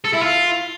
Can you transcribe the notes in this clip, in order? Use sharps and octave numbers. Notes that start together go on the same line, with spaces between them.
A4
E4
F4